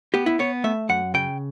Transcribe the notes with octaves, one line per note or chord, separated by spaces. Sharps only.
B3 G4
E4
B3 C#5
A3 E5
F#2 F#5
C#3 G5